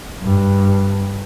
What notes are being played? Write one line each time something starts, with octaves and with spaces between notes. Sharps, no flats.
G2